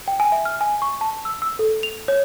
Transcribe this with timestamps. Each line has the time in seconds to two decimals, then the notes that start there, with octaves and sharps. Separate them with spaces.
0.08 G5
0.20 G#5
0.32 E5
0.45 F6
0.61 G#5
0.82 C#6
1.01 A5
1.25 E6
1.42 E6
1.59 A4
1.83 F7
2.08 C#5